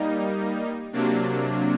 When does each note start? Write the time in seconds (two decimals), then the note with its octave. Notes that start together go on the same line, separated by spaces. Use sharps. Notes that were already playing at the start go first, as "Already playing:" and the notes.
Already playing: G3 A#3 D#4
0.92 C3 F#3 A#3 D4